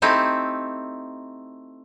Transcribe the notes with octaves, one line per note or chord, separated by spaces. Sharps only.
A3 C4 D#4 E4 G4